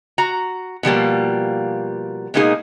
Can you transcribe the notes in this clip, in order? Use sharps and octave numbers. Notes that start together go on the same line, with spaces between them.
F#4 A#5
B2 F3 G3 A#3
B2 G#3 A#3 D#4 G#4